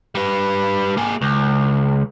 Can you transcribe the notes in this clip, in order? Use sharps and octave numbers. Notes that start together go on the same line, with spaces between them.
G3 B4
A#3 G#4
C#2